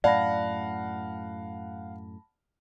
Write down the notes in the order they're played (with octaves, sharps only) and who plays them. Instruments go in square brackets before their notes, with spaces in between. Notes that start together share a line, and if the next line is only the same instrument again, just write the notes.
[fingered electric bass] F#2 A2 [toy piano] D5 [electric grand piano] F5 F#5 [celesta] A5 B5 A#6